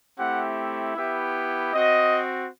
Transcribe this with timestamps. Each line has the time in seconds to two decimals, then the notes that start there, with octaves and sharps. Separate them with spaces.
0.18 A3 C4 E4 G4 F#5
0.95 B3 E4 G4 E5
1.72 C4 F#4 D#5